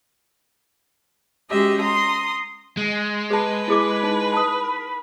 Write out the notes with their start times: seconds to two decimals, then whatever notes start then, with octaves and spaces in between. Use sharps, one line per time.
1.50 G#3 C#4 F#4 G4 D#5 E5
1.81 A#5 C6 D#6
2.77 G#3
3.30 G#4 B4 A5
3.68 E4 G#4 B5 D6
4.03 D#4
4.33 A5 D#6